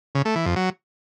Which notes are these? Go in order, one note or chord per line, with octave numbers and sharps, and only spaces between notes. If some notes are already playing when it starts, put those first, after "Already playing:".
C#3
A3
E3
F2
F#3